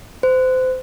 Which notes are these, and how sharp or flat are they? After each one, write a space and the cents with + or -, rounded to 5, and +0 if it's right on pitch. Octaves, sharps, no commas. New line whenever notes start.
C5 -30